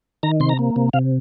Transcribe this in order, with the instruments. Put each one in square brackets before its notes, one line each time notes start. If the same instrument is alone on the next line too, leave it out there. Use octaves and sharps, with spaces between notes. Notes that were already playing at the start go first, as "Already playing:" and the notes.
[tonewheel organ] D#3 A#5
C3 C6
A#5
A#3
C3
C3 F5